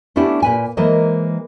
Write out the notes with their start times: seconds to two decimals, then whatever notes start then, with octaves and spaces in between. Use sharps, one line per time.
0.16 A3 B3 C#4 D4 E4 G4
0.42 A#2 B4 G#5
0.77 E3 G#3 A#3 A#4 C5 D#5